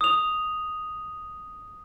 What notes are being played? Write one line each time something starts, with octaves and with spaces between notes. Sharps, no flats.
D#6 F7